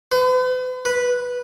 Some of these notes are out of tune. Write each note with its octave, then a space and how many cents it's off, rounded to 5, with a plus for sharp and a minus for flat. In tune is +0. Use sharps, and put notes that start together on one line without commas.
B4 +45
B4 -5